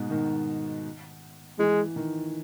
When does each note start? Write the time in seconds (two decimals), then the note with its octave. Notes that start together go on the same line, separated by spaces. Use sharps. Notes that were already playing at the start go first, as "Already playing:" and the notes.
Already playing: G#2 B2
0.10 D#3
1.59 E3 G#3
1.96 D#3